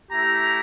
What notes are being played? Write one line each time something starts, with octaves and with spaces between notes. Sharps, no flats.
A3 E4 G4 A#5